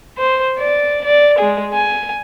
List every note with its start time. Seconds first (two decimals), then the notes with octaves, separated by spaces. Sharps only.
0.18 C5
0.59 D5
1.04 D5
1.38 G#3 G#4
1.73 G#5